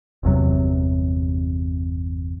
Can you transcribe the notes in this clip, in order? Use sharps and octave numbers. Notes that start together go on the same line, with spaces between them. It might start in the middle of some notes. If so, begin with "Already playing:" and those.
G1 E2 C3 F#3